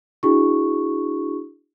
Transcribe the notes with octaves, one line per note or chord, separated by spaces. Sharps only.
D4 E4 F#4 G#4 C#6